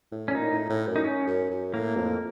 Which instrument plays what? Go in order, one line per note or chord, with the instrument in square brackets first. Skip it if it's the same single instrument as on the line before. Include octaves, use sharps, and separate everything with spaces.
[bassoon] A2
[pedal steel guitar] C#4
[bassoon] A#2 [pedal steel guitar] D#4
[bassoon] A2
A2
F#2
[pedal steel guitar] D#4
C#4
[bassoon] F#2
F#2
[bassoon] A2 [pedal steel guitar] A#3
[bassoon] F2